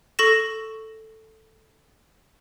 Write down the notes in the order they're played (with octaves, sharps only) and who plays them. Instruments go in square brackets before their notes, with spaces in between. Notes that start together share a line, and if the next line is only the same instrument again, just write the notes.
[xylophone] A4 C#6 A#6 E7